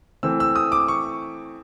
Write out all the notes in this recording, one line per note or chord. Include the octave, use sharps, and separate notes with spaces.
E3 A3 C4 E6
E6
D#6
D6
C#6